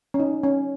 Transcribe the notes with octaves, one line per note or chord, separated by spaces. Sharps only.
C#4
D#4
C#4